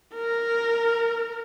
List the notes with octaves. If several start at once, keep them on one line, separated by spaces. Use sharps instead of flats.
A#4